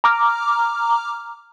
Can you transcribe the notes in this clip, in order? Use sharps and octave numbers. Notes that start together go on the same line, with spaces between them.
A#5 D6 F6